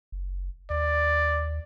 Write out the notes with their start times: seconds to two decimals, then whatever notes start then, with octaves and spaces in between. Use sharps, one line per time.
0.12 F#1
0.70 D#2 D5